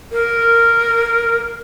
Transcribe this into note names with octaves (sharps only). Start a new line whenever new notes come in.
A#4